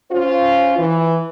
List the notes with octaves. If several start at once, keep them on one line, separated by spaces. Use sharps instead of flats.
C#4 F4 C5
E3